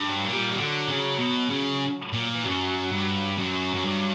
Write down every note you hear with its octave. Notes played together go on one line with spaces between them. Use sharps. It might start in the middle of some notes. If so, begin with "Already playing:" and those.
Already playing: G2
F#3
A#2
G3
E3 G3
D3 F#3
C#3
B2
C#3
A#2
E3
F#2 F#3
G2
F#2 F#3
F#2
G2